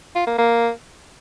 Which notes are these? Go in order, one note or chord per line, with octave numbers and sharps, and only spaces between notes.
F4
A#3
A#3